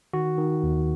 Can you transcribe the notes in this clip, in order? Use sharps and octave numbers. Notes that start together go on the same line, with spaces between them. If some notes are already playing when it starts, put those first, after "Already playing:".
D#3 F#4
D#3
D#2